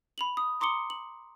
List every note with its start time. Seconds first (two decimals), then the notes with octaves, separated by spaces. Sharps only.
0.18 B5 F7 F#7
0.37 D#6
0.61 A#5 C6 D6 D#6 C#7 G7
0.90 F#7